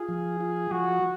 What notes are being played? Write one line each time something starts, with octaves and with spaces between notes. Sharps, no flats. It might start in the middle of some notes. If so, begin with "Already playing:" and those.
Already playing: F4 G#4
F3
F4
F3 F#4